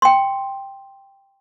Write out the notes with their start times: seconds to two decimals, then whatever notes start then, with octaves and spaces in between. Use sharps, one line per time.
0.02 G5 C6